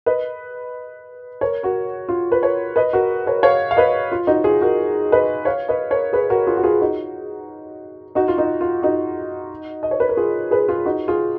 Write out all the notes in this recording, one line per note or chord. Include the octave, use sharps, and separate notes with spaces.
B4 D#5
A#4 C#5
F#4 A#4
F4
B4
A#4 C#5
B4 D#5
F#4 A#4
A#4 C#5
C#5 F5
F5
B4 D#5
F4
D#4 F#4
F4 G#4
F#4 A#4
B4 D#5
C#5 F5
B4 D#5
A#4 C#5
G#4 B4
F#4 A#4
F4 G#4
F#4
F4 G#4
D#4 F#4
D#4 F#4
F4
D#4
F4
D#4 F#4
D#5
C#5
B4
A#4
F4 G#4
G#4 B4
F4 G#4
D#4 F#4
F4 G#4